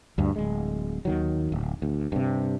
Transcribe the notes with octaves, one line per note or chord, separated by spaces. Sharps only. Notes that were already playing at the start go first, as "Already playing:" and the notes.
D2 G2
D1 G#3
D#2 D#3 F#3
D1
D2
G2 C3